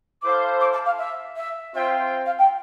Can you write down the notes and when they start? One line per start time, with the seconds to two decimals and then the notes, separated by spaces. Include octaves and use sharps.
0.22 E4 A4 C5 F5 D6
0.60 D6
0.73 A5
0.85 F5
0.98 E5
1.36 E5
1.74 C4 F4 C5 E5 G5
2.25 F5
2.38 G5